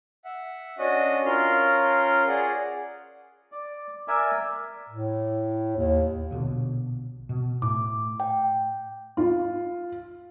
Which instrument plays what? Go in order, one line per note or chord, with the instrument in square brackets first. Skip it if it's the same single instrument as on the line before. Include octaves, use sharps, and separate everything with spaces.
[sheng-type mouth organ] E5 F#5
C#4 D4 F#4 D#5
C#4 F4 A#4 C6 F6
G#4 D5 F#5
[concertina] D5
A#4 D5 E5 G#5
[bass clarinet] A2
D#2
[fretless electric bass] A#1 B2 D3
B2
[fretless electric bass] A2 [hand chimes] D6
[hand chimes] G5
[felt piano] F4